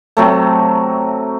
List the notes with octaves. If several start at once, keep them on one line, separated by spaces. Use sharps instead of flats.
C3 F#3 A3